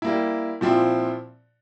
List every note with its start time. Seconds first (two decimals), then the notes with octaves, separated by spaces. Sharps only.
0.02 G3 A#3 E4
0.61 A#2 F3 C4 E4